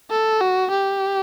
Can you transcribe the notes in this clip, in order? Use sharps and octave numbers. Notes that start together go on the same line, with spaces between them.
A4
F#4
G4